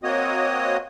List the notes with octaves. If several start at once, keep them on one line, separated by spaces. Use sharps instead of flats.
A#3 C4 F#4 C#5 D#5 D#6